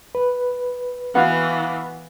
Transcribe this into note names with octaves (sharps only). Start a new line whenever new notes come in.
B4
E3 B3 F#4 F5